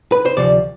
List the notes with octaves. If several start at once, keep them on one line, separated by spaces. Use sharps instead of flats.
B4
C5
D2 C3 F3 D5